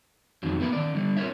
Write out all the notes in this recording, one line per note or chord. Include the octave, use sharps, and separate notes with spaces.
F2 D#3 F#3
A#3 B3 E4 A#4 B4
D#3 D5
D3 G3
F4 A#4 C5 C#5 E5